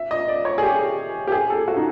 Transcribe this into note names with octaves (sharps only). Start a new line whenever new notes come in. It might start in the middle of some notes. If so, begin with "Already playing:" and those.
Already playing: E5
D#5
D5
C#5
G#4
G4
G4
G#4
A4
F#4
D#4